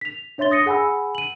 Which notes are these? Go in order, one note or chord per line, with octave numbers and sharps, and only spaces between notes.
B6 F7
D4 C#5 E5 C6 A6 G7
D#6 A#6 C#7 D#7
G#4 F#5 G#5 B5 E6
D#7 F#7